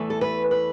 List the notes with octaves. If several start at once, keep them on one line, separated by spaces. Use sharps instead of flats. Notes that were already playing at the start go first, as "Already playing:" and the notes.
Already playing: E2 E3 A3
A4
B4
B4